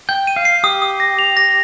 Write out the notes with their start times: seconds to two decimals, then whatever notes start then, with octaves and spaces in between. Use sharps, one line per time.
0.09 G5 G6
0.27 D#7
0.36 F5
0.45 C7
0.64 G4 D#6
0.82 D#6
1.00 A#6
1.19 F7
1.37 A#6